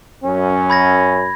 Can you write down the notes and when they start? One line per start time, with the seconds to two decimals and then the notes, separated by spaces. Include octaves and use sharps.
0.23 F#2 C#4
0.70 B5 G#6 A#6